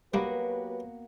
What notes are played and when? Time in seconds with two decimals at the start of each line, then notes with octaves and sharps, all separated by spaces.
0.14 F#3 G3 A#3 B3 D4 F#4 G4 B4